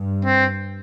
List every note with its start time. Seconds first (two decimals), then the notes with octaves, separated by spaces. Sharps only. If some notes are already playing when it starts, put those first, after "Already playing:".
Already playing: G2
0.24 C4